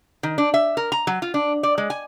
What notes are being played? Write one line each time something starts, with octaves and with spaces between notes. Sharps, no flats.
D#3
D4
E5
A#4
A#5
F#3
F4
D4
D5
G#3
G#5